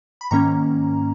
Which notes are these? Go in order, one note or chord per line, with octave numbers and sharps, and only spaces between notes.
B5
G#2 D#3 A#3 C#4 A#5